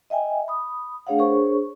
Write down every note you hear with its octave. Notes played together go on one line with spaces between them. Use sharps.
D#5 E5 G5 G#5
B5 D#6
A3 D4 G#4 C#5 F5 F#5
D4 G#4 A#4 C5 C#5 C#6